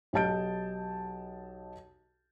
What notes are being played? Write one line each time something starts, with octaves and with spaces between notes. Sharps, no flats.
B1 G4 D#5 A5 G6 D7